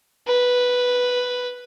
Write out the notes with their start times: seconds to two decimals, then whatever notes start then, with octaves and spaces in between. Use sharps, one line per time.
0.27 B4